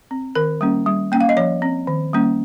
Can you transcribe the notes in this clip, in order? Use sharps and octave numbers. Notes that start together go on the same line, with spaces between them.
C4
D#3 A#4
G3 A#3 C#4
G3
A#3 C#4 G5
F5
D#5
F3 C#5
C4
D#3
G3 A#3 C#4